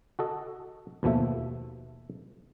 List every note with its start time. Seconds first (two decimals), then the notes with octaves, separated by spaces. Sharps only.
0.19 F#4 A4 D#5
1.03 D#2 B2 F3 A3 E5